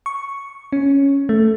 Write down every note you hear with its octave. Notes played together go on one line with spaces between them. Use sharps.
C#6
C#4
A3